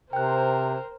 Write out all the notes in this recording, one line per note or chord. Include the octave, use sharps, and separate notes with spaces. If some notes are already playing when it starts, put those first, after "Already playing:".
C3 A#4 C5 G5 F#6